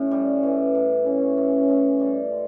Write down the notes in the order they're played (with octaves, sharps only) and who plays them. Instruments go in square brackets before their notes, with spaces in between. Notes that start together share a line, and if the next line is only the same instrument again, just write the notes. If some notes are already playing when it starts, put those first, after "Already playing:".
Already playing: [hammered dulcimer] A2 [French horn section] C#4
[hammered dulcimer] G3
E3
A2
[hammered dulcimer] E3 [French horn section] C#4
[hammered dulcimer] A2
A2
G3
G#3